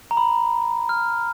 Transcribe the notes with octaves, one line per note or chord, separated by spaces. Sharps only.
A#5
B5
F6